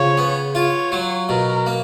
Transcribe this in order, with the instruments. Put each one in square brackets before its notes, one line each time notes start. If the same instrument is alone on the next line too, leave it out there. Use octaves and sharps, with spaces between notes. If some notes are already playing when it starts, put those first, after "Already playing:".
Already playing: [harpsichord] C#3 F3 [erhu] C#5
[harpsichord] B3
[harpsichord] F4 [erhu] C#5
[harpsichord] F#3
[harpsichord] B2 [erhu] A#4
[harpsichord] A#3